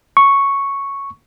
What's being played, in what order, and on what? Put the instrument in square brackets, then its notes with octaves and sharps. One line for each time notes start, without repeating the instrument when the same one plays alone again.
[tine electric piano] C#6